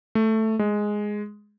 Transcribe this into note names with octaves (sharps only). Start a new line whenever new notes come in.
A3
G#3